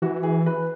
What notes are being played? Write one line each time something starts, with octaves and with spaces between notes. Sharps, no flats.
E3 F#4
G#4
B4